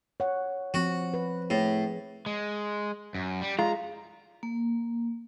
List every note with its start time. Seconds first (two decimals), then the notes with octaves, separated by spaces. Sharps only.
0.20 C#5 F#5
0.74 F3 C4 F#4
1.14 B4
1.50 A2 G#4
2.26 G#3
3.15 F#2
3.42 G3
3.59 G#3 F4 A#5
4.43 A#3